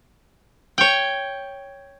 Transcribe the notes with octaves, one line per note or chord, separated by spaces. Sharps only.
C#5 G5